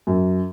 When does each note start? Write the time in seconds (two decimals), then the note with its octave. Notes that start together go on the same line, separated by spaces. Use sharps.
0.07 F#2